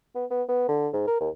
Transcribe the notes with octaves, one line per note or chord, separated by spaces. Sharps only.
B3
B3
B3
D3
G#2
A#4
D#2